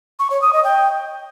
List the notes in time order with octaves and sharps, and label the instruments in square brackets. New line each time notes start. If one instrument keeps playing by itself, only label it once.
[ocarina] C#6
C#5
D#6
D#5
G5